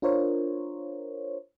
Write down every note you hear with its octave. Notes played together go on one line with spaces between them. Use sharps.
D4 F4 A#4 C5 C#5